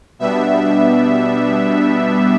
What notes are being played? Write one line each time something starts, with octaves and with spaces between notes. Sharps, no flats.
B2 G3 B3 D4 E5